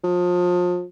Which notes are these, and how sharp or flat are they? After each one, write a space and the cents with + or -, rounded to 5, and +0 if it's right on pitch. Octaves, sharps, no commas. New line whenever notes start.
F3 +30